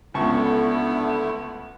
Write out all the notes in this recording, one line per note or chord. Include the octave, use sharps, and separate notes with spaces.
C#2 D3 A3 B3 E4 A5 C#6